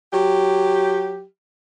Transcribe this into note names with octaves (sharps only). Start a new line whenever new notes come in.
F#3 G4